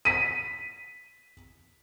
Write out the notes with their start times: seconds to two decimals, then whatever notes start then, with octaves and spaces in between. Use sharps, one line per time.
0.05 B6 D#7